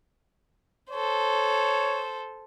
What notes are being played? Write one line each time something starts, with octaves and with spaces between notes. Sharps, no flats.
A4 C5 C#5